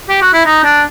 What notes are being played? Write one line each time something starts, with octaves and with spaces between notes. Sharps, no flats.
G4
F#4
E4
D#4
D4